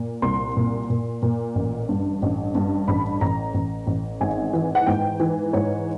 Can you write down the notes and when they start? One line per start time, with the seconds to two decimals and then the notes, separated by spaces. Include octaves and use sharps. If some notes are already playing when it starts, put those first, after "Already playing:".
Already playing: A#2
0.22 C2 C6
0.57 A#2
0.90 A#2
1.22 A#2
1.55 A1
1.89 G2
2.22 A1
2.55 G2
2.88 A1 B5
3.21 A1 A#5
3.54 A1
3.87 A1
4.21 G#1 G#5
4.53 E3
4.75 F#5
4.86 G#2 G5
5.20 E3
5.53 G#2 C#5